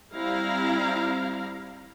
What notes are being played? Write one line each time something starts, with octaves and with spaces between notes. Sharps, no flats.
G3 C4 E4 F5 A#5